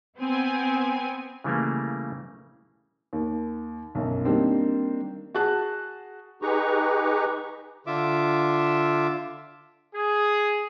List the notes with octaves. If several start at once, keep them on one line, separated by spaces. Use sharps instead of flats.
B3 C4 G#5
C#3 E3 G3 A3 A#3
D#2
B1 F#2
D#3 G3 A#3 C4 D4
F#4 G#4 A5 F#6
D#4 G4 G#4 B4 A#5 C#6
D3 F4 E5 D6
G#4